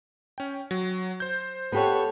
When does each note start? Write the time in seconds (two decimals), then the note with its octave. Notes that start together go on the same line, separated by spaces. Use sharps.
0.38 C#4 G5
0.71 F#3
1.20 C5 G6
1.72 B3 G4 A4 C#5 F#5